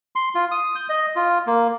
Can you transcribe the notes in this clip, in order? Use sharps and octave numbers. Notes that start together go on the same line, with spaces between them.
C6
F4
D#6
G6
D#5
F4
A#3